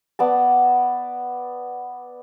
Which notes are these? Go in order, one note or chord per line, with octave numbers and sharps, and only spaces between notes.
B3 D5 A5